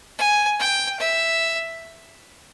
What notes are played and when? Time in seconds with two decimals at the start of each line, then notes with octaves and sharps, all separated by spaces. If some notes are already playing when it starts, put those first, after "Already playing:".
0.19 G#5
0.60 G5
1.00 E5